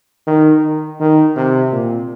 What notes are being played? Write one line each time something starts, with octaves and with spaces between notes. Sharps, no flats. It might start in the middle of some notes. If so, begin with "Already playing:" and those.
D#3
D#3
C3
A#2